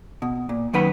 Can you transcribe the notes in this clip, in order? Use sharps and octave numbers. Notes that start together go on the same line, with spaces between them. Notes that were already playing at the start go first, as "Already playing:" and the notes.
B2
A#2
F#2 D#3 B4 F#5 B5